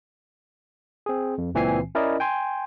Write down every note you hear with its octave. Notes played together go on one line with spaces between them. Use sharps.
C4 G#4
F2
C#2 A#2 E3 C4 G#5 C7
C#4 E4 A#4 D5 D#5
G5 G#5 C6